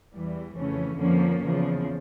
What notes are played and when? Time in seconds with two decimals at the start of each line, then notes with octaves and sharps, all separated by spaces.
0.14 E2 E3 G3
0.57 F2 C#3 E3 A3 C#4
0.99 F2 D3 F3 A#3 C#4
1.42 E2 C#3 F3